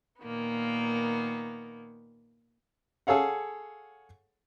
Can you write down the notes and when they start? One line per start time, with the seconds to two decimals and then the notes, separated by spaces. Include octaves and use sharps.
0.21 A#2 D#3 A#3 B3
3.07 G#4 A4 C#5 F5 F#5